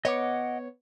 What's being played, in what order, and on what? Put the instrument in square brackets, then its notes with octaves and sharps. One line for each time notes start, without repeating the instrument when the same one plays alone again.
[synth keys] B3 C#5 [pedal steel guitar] D#5 F#5 D6